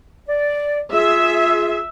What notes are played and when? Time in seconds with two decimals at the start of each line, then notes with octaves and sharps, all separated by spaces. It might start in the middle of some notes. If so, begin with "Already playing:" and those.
0.27 D5
0.92 F4 G#4 E5